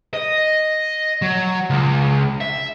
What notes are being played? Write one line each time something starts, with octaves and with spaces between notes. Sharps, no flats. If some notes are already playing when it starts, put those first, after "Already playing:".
D#5
F#3
C#2
E5